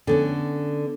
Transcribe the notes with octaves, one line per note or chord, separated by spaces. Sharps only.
D3 B3 C#4